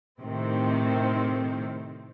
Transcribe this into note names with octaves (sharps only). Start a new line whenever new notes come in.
A2 C3 D#3 C4